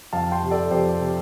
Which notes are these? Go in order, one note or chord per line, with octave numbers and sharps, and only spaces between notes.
F2 F5 A5
G5 C6
C3
A4 D5
F2 G4 C5
C3